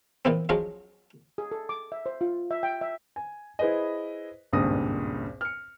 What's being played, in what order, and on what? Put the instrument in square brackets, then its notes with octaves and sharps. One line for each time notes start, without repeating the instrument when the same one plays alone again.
[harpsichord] A#2 E3 B3 C4
F3 F#3 G#3 C#4 F4
[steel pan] G#4
A4
D6
E5
C5
F4
E5
G5
E5
[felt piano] G#5
E4 G#4 B4 C5 D#5
G#1 C#2 G2 A#2 D#6 A#6
F6 C#7